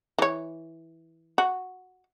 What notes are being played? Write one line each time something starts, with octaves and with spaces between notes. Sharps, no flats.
E3 C#5
F#4